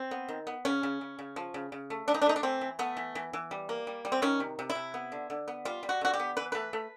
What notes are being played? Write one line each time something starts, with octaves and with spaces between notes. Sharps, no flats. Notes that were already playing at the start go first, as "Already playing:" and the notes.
Already playing: C4
B3
D#3
B3
C#3 C#4
C#3
C#3
C#3
F3
C#3
C#3
A3
E3 D4
D#4
D4
A3 D#4
D4
E3 C4
E3
A3 B3
E3
E3
E3
G3
A#3
G3
G3
C4
D#3 C#4
C3
C3
E4
C3
B3
D3
D3
B3
G3 F4
G3
F#4
D3 F#4
G4
B3
E3 B4
A3 B4
A3